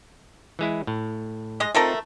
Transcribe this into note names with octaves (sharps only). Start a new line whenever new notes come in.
E3 G#3 E4
A2
G#3 D#5
A3 C4 D#4 F4 A4 A#4